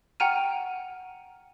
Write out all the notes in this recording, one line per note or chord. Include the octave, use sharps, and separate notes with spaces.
F#5 G5 A#5 F6 D#7